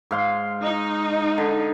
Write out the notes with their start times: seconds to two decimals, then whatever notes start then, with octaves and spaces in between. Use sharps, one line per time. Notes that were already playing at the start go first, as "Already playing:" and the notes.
0.11 G#2 F5 C6
0.63 D#4
1.38 D3